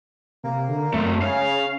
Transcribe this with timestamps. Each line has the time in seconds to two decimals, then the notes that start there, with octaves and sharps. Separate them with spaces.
0.44 C3 A#3
0.68 D3
0.94 F#2 A3 C4
1.22 C#3 C#4 F5